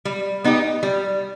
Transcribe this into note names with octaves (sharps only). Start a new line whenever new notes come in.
G3
B3 D#4 G4
G3